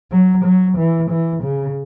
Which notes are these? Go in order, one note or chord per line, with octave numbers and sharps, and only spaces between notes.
F#3
F#3
E3
E3
C#3